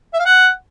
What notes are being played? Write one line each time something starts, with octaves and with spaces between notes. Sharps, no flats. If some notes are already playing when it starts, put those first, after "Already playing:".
E5
F5
F#5